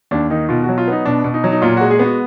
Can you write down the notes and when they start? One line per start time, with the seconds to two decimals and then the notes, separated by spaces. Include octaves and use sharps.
0.11 D#2 D4
0.30 D#3 D#4
0.49 B2 F4
0.63 F#4
0.69 F#3
0.78 F4
0.88 B3 D#4
1.05 B2 D4
1.24 B2
1.34 D#4
1.44 F#3
1.52 D#4
1.62 A#2 F4
1.77 G#3 F#4
1.90 G#4
1.99 B3 F#4